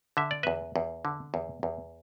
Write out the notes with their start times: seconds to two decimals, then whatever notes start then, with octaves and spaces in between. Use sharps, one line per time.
0.17 D3 E5
0.31 D5
0.43 E2 B4 E5
0.76 E2
1.05 D3
1.34 E2
1.63 E2